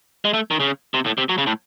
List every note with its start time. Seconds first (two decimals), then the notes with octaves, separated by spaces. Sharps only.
0.25 G#3
0.34 A3
0.51 D#3
0.60 C#3
0.94 C3
1.06 A2
1.18 C3
1.29 F#3
1.38 C#3
1.47 A2